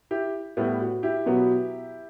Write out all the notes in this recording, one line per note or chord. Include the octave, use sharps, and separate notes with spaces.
E4 G4
A2 G3 B3 E4
F#4
E4 G4
B2 F#3 B3